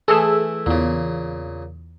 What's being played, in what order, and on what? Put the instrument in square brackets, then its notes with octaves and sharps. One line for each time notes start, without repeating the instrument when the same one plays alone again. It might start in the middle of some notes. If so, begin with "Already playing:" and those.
[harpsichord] E3 A3 E4 [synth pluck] G#4 A4 E6
[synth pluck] E2 [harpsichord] A#2 C#3